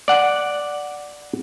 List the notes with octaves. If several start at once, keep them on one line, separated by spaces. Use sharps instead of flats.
D5 F#5